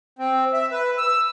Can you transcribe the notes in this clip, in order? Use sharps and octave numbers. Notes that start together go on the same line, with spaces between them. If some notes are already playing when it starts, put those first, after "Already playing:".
C4
E5
B4
E6